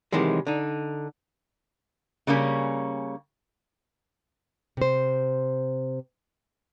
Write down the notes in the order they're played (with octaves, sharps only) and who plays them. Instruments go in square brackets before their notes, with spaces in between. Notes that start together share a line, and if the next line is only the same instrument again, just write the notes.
[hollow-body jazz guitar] C3 D#3 E3 F#3 G#3
D3 D#4
[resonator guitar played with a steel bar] C#3 G3 A#3 C#4
[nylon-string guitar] C3 C5